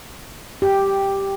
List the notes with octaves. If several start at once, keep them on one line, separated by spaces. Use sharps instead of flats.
G4